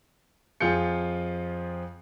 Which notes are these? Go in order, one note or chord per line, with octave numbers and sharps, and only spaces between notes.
F2 F3 F4 G#4 G6 C#7